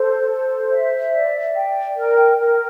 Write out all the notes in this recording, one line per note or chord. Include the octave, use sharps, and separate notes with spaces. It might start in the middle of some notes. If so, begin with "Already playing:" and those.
Already playing: A4 C5
C5
E5
D5
G5
A#4
A#4